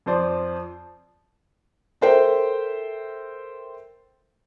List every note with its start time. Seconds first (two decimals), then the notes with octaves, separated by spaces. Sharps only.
0.06 F2 F3 C5 D5
2.01 A4 A#4 C5 E5 G5